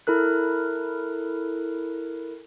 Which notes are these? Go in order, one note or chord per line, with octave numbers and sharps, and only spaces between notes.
E4 A4 A#4 F#6